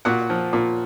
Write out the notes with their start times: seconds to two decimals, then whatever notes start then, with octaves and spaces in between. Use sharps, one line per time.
0.05 A#2 F#4 F#5
0.30 F3
0.53 A#2